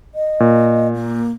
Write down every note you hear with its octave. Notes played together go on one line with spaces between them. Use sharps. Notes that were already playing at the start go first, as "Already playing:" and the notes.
D#5
A#2
A#3